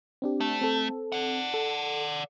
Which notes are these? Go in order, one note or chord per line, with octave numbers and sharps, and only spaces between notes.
C4 D4 G4
A3
C4 A4
D5 F#5
A4